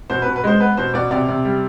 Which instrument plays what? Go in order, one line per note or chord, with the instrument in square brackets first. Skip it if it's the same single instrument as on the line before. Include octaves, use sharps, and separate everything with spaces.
[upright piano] B2 C5
B4
B2
B4
G#3 C5
B3 B4
B2 C5
B2 D5
C3 D5
C3
G3